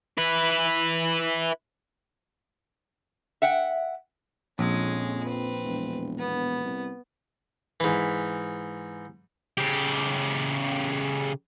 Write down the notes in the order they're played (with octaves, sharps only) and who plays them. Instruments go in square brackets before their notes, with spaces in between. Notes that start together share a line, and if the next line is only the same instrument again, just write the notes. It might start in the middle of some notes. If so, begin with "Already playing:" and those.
[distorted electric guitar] E4 B4
[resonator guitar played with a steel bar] E5 F#5 G5
[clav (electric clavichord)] A#1 [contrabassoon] F2 [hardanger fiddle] G#3 C#4
[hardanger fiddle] C4 B4
[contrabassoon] E1
[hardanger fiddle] B3
[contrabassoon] C2
[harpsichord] G#2 E3
[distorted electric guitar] C#3 G4